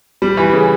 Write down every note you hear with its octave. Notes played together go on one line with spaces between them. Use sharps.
G3
E3
C#3